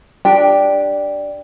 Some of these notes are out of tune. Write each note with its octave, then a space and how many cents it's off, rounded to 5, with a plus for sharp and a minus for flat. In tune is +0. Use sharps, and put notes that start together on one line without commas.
D4 +0 G4 +0 G5 +0